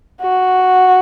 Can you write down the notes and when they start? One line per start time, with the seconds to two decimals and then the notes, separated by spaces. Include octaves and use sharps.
0.21 F#4